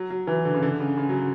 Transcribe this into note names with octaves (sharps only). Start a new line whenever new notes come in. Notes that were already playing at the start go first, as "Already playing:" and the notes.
Already playing: F#3
F#3
E3
D3
C#3
D3
C#3
C#3
F#3